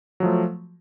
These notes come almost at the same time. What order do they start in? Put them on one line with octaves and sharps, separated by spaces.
F#3 F3 A3